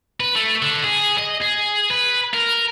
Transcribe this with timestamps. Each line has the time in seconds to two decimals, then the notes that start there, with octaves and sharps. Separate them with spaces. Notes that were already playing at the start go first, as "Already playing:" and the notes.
0.20 B4
0.35 A3
0.62 D3
0.84 G#4
1.18 D#5
1.42 G#4
1.90 B4
2.34 A#4